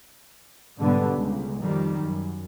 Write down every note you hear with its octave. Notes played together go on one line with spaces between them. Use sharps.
G#2 B2 D3 G3 B3
C#2
F2 D#3 G3
F#2